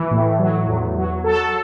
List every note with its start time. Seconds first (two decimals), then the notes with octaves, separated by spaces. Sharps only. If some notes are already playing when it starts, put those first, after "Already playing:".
Already playing: E3
0.11 A2
0.39 F#3
0.67 E2
0.95 F#3
1.24 F#3 A4